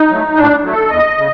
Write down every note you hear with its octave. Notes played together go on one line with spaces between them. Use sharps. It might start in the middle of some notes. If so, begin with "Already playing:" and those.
Already playing: D#4
F#3 A3
A2 D4
F#3 A3
A4
E2 D#5
C#3